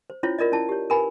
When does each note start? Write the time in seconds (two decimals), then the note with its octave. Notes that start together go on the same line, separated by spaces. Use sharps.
0.10 C5
0.23 C#4 E4 F4 C5 C#5
0.39 F4 A#4 D5 D#5
0.52 C#4 E4 A5
0.69 G4 C#5
0.90 A#4 B4 G#5 B5